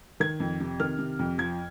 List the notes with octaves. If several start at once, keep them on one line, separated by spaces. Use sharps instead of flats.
D#3 G#6
F2
C3
D#3 F6
C3
F2
F3 G#6